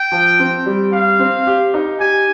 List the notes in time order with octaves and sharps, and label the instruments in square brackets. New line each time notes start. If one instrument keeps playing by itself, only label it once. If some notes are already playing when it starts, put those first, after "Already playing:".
Already playing: [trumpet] G5
[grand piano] F3
C4
G3
[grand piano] G4 [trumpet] F5
[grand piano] C4
G4
D#4
[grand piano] G4 [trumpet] G#5